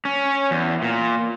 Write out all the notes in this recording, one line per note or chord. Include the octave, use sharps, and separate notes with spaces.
C#4
E2
A#2